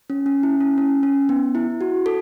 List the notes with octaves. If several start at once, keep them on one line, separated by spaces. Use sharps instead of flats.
C#4
C#4
E4
C#4
C#4
C#4
B3
E4
F#4
A4